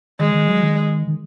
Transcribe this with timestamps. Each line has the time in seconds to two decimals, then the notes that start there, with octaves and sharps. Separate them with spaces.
0.20 D#3 G#3
0.34 D#3
0.48 F#3
0.63 D#3
1.07 D#3